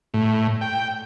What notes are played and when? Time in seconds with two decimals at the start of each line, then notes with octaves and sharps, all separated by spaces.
0.14 A2
0.61 G5